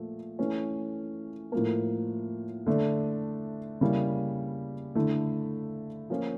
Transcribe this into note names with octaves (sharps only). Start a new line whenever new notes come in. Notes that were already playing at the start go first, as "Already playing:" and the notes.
Already playing: A#2 F3 A3
E3 A3 C#4
A2 F3 A#3
D3 A3 D4
C#3 G3 A#3 E4
D3 A3 E4
F3 A#3 C#4 F4